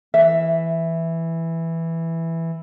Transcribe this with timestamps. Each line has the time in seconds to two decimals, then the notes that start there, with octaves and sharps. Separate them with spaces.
0.14 E3 E5